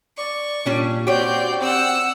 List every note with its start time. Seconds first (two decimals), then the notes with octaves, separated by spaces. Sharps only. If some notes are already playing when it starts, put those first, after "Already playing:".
0.18 D5 C#6
0.66 A#2 G3 C#4 D4
1.07 C4 F#4 G4 C#5 D5 G5 G6
1.61 C4 F#5 E6